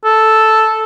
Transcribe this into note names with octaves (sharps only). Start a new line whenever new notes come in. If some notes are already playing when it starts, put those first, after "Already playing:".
A4